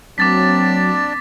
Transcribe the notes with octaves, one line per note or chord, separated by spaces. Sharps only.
F#3 A#3 C4 D4 D5 D6 A6 B6